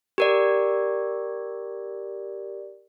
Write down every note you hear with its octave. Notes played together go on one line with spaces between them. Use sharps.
G4 A#4 D5